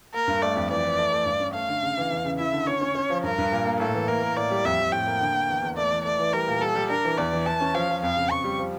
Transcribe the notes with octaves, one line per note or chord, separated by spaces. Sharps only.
A#3 A#4
G2
A3 D5
F2
E3 D5
E3
A3
A3
G2
C#4
A3 F5
D3
C#3
E3
E2
C#3
E4 E5
D3
C#4 C#5
C#4
C#4
F3
G2 A#4
G2
A#2
A#3
A2 A4
E3
A#3 A#4
A#3
A2 D5
G3
F2 E5
F2
A2 G5
A#3
D3
A#3
E2
E2
A3 D5
E3
A3 D5
E3
G3 A#4
A#2
G3 A4
G3
D4 A#4
E3
E2 D5
E3
E3 A5
C#4
F3 F5
F3
F2 F5
C#3
F2 C#6
G3
F3